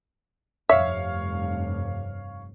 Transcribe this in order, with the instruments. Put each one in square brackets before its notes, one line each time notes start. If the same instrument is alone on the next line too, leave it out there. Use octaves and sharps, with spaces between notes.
[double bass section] F1 G2 [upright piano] C#5 F5 [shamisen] E5